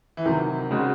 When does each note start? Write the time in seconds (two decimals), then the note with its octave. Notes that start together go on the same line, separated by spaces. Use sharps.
0.17 E3
0.25 C3 D#3 F#3 C4
0.71 C#3 G#3 C4 F#4